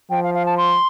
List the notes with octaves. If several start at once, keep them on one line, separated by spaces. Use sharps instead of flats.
F3 G5
F5
F5
A5
C6